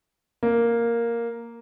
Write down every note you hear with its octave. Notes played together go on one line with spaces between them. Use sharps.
A#3